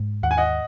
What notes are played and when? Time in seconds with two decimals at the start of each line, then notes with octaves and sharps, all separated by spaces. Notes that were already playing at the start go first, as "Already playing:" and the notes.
Already playing: G#2
0.23 D#2 F#5
0.31 G#5
0.37 D#5 F#5